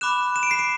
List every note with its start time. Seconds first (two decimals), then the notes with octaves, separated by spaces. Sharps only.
0.01 B5 D6 F#6 E7
0.36 E7
0.43 D7
0.51 C7
0.59 D7